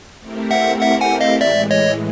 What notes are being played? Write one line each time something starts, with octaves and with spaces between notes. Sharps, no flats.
A3 C4 E4 G4 A#4
E5 F#5
E5 F#5
F#5 G#5
D#5 F5
A2 E3 G#3 D5 E5
C#5 D#5